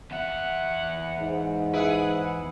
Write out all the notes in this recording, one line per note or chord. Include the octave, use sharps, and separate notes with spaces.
E2 E5 F#5
G#2
E4 G#4 B4 F#5